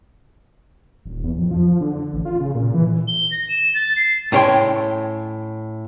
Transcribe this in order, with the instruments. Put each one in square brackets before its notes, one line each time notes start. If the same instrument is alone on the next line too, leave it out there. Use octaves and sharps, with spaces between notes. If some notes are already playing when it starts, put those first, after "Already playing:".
[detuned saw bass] D#1
E2
F2
F3
D3
A1
F4
C#3
A#2
E3
[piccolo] G7
A#6
E7
A6
C7
[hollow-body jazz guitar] A2 B3 C#4 C#5 G5 C6